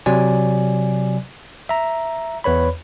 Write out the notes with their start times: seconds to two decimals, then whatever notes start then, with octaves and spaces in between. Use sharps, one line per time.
0.06 C3 F#3 D5 G#5
1.69 E5 A#5
2.44 E2 B4 C#5 B5